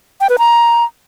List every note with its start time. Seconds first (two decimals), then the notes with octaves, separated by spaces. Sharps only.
0.21 G5
0.30 B4
0.39 A#5